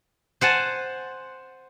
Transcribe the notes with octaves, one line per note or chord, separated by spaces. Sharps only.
C5 F#5 G#5 A5